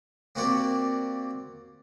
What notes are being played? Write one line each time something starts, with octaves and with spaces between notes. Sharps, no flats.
A#3 C4 F#4 G4 D5